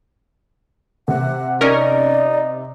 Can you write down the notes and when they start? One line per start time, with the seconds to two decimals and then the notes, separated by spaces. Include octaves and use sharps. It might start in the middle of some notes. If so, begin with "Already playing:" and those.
1.08 C3 F#5
1.61 C#4 D#4 A#4 D5